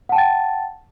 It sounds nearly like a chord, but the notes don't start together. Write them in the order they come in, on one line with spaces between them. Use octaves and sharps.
F#5 A5 G5 A6